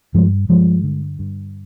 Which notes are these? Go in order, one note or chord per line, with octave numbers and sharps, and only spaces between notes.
G2 F3 G#3
G2 F3 G#3
D3
G2